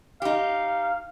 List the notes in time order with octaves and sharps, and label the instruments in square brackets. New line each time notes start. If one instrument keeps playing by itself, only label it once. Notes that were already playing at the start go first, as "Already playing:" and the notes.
[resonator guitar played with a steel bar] D#4 G4 [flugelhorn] F5